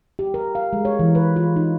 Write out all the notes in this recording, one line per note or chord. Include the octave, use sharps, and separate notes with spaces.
G4
A#4
F5
G#3
C#5
E3
B4
F4
D#4